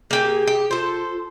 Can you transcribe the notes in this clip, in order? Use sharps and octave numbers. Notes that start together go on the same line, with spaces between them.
A#3 G4 G#4 G#5
G4
F4 A4 C5